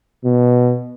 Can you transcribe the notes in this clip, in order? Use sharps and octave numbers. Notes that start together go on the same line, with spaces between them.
B2